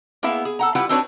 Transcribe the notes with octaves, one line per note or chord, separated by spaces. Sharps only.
A#3 B3 E4 G#4 E5 F5
G#4
A4 F#5 A#5
G3 E4 F4 G4 B4 F#5
C4 D4 D#4 F#4 B4 C#5